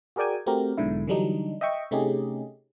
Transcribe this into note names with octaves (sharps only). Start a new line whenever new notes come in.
F#4 G#4 A#4 D5 G5 G#5
A3 C4 F#4 G4 A#4
B1 G#2 B2 D3 E4
D3 E3 F#3 G3 D4 D#4
D#5 E5 G5 C#6
C3 A3 C#4 D#4 G4 G#4